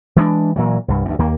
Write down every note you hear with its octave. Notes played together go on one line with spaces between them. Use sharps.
E3 G#3 C4 D4
A#2 E3 F#3
C2 G2
D2 G2 B2
D#2 A#3